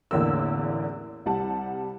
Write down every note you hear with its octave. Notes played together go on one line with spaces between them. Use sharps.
A1 E2 D3 A#3 E6
C2 G3 F#5 A5